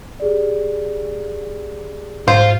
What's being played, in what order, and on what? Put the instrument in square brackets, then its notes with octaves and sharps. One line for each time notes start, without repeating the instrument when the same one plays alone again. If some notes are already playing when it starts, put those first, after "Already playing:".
[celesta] G4 G#4 D5
[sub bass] G#2 [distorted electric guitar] F4 [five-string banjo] C5